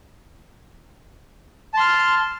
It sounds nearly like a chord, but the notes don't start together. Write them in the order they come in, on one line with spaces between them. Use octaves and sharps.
A5 C6 F6